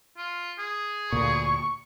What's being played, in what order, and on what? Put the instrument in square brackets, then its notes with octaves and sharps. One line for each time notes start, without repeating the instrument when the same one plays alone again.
[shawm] F4
G#4
[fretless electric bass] D2 A#2 [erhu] C#6